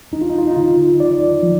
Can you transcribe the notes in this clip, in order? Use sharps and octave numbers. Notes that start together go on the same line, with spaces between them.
D#2 D#4
F4
D#4
F4
D#4
D3 F4
D#2 D5
F3